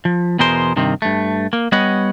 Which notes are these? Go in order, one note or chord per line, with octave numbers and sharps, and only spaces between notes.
F3
E2 B2 G#4 A#4 C5 C6
G2 C3 D#3 C4
G2 A3
A#3
G3 B3 C#5 D#5 F#5